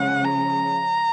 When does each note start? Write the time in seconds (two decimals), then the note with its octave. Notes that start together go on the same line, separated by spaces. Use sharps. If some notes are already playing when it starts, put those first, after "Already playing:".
Already playing: C#3 F3 G#3 C#4 F#5
0.24 A#5